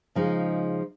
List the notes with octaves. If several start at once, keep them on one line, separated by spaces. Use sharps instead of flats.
C#3 F3 G#3 D#4